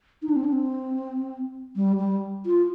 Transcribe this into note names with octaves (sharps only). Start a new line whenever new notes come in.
D#4
D4
C4
D4
C4
G3
G3
F4